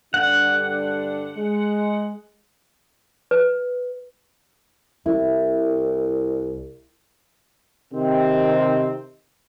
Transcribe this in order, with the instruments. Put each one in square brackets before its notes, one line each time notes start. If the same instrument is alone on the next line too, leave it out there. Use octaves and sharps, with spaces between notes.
[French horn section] G2 D3 D4 [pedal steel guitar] F#5
[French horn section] G#3
[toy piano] B4
[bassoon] C2 [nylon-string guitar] E4
[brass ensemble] C3 D#3 C4